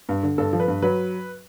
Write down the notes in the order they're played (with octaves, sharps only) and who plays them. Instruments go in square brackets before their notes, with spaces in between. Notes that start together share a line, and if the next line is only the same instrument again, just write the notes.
[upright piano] G2
D3
G2 A4
F3
B4
G2
F#3 B4